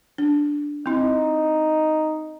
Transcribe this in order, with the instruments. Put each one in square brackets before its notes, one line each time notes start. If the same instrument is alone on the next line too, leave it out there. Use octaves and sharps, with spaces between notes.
[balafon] D4
[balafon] C4 E4 [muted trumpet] D#4